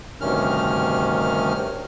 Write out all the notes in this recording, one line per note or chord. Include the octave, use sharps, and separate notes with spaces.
D2 G2 C3 D#3 C#4 F6